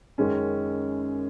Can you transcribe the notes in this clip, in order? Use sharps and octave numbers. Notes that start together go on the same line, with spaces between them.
F#2 D#3 G#3 C#4